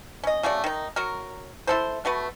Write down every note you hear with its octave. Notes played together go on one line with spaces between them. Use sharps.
C#4 D#5
C#3 A3 F#4 D5
D#3 D#4
F#3 F#4 A#4
E4 A4 C5
B2 A3 F#4 B4